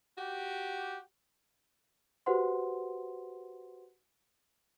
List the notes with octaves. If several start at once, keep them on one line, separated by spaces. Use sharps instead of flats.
F#4 G4
F#4 G4 B4 C5 F#5 C6